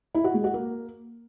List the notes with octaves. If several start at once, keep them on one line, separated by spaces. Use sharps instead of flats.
E4
F#4
G#3
F#4
A#3